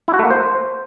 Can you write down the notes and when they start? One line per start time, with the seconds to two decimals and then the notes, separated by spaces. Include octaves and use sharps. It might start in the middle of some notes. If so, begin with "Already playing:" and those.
0.08 E4
0.14 F#4
0.19 A3
0.25 A#3
0.30 C5